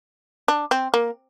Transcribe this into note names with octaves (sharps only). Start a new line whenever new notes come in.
D4
C4
A#3